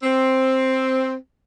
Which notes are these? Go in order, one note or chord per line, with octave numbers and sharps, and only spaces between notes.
C4